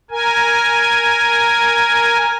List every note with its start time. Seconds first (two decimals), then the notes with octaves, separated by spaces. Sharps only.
0.11 A#4 G#5